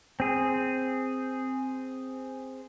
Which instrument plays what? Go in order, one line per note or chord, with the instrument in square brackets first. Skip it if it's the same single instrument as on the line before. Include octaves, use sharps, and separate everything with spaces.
[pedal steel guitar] C4 G#4